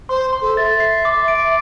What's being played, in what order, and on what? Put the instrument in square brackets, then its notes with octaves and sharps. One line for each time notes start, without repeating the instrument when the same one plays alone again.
[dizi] C5 [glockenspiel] C6
[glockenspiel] C6
[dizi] A4
[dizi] E5 [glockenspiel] A6
[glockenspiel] C7
D6
D7